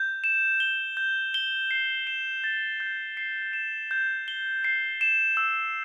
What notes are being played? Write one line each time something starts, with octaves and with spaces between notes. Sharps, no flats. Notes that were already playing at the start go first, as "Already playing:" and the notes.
Already playing: G6
E7
G7
G6
G7
C7
E7
A6
G6
C7
E7
G6
G7
C7
E7
E6